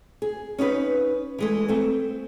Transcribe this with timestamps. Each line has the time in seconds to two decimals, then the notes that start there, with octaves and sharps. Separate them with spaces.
0.22 G#4
0.58 C#4 D#4 E4 B4
1.38 E3 G#3 A3
1.68 A3 C4